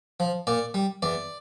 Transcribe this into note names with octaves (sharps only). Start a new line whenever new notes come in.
F3
A#2 D5
G3
E2 D5